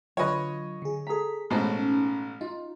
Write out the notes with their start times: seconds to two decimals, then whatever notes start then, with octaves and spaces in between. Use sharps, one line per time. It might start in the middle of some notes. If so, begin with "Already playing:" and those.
0.17 D3 F#3 F4 B4 C#5 D#5 B5
0.82 D3 G#4
1.07 G#4 A4 A#5 B6
1.50 A1 B2 G#3 C#4 D#4 A4 A#4 C5
2.41 D#4 F4